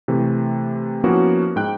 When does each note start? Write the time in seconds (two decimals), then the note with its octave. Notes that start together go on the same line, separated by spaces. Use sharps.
0.08 C3 E3 A3 C4
1.04 F3 A#3 B3 C#4 E4 F#4
1.56 G#2 G5 F#6